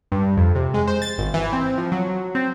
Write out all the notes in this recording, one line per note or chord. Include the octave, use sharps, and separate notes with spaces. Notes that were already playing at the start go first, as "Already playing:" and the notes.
G2
F2
C3
G#3
C5
A6
G#1
E3
C4
F3
F#3
C4